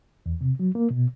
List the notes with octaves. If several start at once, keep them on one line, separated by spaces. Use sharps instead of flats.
E2
C3
F#3
A#3
B2